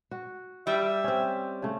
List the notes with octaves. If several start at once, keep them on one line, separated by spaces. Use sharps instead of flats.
F#4
G3 E5
C4 C#4
C#3 A3